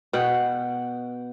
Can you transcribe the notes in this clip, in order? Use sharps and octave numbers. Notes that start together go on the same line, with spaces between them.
B2 F#5 G5